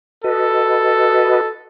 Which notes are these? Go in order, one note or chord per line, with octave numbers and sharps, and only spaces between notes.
F#4 A4 B4 D#5